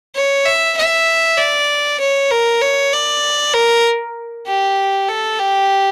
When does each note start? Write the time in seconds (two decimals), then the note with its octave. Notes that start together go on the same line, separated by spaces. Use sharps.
0.16 C#5
0.46 E5
0.78 E5
1.38 D5
2.00 C#5
2.31 A#4
2.62 C#5
2.93 D5
3.54 A#4
4.47 G4
5.09 A4
5.40 G4